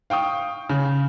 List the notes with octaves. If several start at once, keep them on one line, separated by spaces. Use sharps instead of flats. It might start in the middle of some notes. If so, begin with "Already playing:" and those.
F5 G5 C#6 D#6
C#3